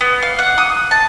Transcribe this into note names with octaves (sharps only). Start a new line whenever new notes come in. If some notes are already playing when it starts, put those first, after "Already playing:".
B3
F5
F#5
D#6
A5